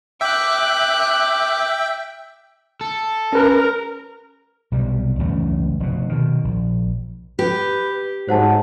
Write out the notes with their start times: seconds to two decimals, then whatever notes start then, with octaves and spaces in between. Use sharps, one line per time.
0.21 E5 G5 D6 F#6
2.81 A4
3.33 C#4 A#4 B4
4.72 B1 C3 G3
5.19 C#2 F#2 E3 A3
5.80 F1 B2
6.09 B2 D#3
6.44 A#1
7.39 G4 B4
8.29 G#2 F#3 C5 F#5 A5